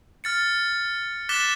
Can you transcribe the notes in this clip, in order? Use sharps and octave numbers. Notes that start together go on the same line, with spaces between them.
F6 A6 C#7
D6 F#6 A6 B6 E7 G7